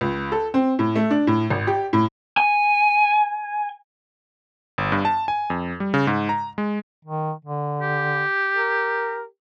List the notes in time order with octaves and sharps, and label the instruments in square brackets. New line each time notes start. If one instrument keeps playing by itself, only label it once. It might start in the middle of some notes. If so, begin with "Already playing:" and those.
[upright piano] C#2
A4
C4
A2
A3
D4
A2
G#1
G4
A2
[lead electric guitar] G#5
[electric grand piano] G1
G2
A5
G#5
F2
G3
C#3
G#2
A#5
G#3
[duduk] D#3
D3
[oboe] G4
[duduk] A#4